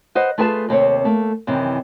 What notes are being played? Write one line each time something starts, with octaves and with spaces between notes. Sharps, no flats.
B4 C5 D#5 F#5
A3 F4 G#4 B4 F#5 A5
D#2 C3 C4 C#5
A3 A#3
F#2 C3 D#3 E3